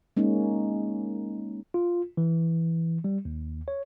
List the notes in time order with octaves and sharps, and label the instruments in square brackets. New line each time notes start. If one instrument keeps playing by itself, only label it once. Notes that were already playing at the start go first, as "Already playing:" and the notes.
[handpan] G#3 A#3 C#4 D#4
[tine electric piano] F4
E3
G3
D#2
C#5